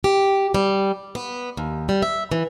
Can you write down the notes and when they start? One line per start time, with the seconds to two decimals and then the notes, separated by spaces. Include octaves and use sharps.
0.04 G4
0.54 G3
1.15 B3
1.57 D#2
1.89 G3
2.02 E5
2.31 E3